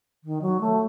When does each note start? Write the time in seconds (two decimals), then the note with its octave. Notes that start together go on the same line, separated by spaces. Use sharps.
0.24 D#3
0.42 F#3
0.61 A3